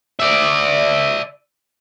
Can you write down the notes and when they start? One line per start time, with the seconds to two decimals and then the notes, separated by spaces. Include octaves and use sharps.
0.19 D5 E5